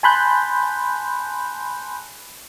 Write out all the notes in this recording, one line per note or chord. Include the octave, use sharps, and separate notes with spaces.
G#5 A5 B5 C6 F#6 G6